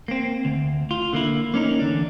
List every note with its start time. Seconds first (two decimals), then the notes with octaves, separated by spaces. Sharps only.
0.08 A#3 C4
0.45 D2
0.91 F4
1.13 D3 A#3 E4
1.54 A#3 C#4 D#4 A#4
1.79 E2 D3 D4